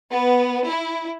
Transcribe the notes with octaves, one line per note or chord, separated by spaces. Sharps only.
B3
E4